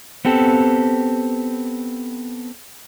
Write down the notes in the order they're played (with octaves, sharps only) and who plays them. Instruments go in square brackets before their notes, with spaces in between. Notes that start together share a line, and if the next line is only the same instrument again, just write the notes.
[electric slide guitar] B3 C4 G4 A4